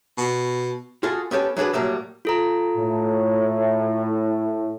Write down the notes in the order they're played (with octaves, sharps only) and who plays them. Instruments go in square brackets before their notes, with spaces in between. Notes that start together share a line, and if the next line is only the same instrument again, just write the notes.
[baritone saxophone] B2
[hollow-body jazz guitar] F4 F#4 G#4 A4
B3 C#4 G4 A4
F#3 D4 G#4 A4 B4
A2 F#3 G3 A#3
[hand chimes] F4 A4 A#5
[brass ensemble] A2